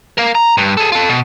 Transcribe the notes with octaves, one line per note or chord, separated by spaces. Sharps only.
A#4 F5
A#5
G2
G#4 A4
F4 A4
B2